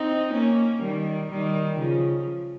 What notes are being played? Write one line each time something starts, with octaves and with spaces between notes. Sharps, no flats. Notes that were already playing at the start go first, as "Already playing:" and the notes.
Already playing: C4 D#4
A#3 C#4
D#3 G3
D#3 G3
C#3 F3